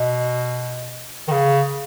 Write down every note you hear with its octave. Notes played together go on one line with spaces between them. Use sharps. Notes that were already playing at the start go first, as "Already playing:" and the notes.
Already playing: B2
D#3
C#3